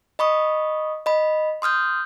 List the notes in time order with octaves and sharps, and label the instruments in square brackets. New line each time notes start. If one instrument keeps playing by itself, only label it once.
[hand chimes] D#5 B5 C#6 D#6
D#5 B5
C6 D#6 F6 G6